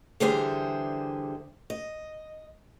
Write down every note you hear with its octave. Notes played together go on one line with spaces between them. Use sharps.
D3 E3 G3 G#4 C5 E5
D#5